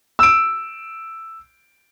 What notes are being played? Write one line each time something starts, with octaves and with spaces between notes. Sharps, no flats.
E6 D7